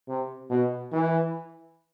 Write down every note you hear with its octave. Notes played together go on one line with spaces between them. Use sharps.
C3
B2
E3